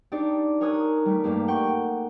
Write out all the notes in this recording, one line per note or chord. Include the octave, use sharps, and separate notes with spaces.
D4 D#4 G4 D5
A#4 C#5 G#5 D#6 F#6
G3 A3
G2 A3 A#3 G4
F#5 G5 C#6